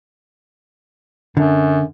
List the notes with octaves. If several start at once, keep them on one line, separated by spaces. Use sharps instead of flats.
F#2 D3